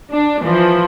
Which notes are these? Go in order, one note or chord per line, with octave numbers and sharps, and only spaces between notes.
D4
E3 F3